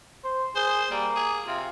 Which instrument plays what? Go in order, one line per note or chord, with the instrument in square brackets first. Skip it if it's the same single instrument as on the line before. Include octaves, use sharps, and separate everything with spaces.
[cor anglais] C5
[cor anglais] G#4 [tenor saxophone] C5
[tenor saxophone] G3 [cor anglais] A#3
[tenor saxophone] G#4
[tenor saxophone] C3 [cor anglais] F4